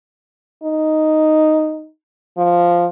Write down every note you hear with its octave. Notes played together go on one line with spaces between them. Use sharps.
D#4
F3